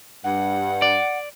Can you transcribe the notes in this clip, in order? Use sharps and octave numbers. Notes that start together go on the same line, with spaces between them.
G2 F#5
D5